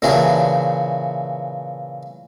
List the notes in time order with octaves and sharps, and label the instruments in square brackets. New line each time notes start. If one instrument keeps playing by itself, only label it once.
[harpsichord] A#2 C#3 E3 D4 F#4 G4